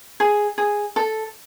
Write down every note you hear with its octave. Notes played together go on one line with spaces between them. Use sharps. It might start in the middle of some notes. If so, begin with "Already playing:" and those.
G#4
G#4
A4